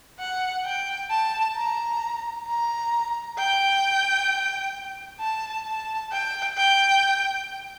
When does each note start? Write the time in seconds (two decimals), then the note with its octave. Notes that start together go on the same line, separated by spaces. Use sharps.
0.19 F#5
0.65 G5
1.10 A5
1.56 A#5
2.47 A#5
3.38 G5
5.21 A5
5.67 A5
6.12 G5
6.57 G5